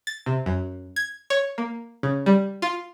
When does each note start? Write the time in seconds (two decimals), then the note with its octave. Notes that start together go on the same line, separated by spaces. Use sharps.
0.07 A6
0.26 C3
0.46 F#2
0.96 G#6
1.30 C#5
1.58 A#3
2.03 C#3
2.26 G3
2.62 F4